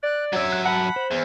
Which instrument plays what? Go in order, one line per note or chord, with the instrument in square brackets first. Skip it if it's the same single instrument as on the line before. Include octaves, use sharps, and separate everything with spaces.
[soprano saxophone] D5 [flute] F#6
[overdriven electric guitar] F#3 E5 [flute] C#5
[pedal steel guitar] F#6
[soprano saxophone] F#5 [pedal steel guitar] A5 [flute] B5
[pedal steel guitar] C5
[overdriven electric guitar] E2